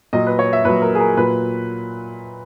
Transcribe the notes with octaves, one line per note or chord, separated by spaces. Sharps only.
A#2 F#3 D#5
B4
C#5
E5
A#2 F#3 B4
A#4
G#4
A#4
A#2 F#3 B4